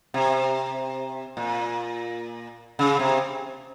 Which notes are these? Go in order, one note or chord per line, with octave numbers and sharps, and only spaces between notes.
C3
A#2
C#3
C3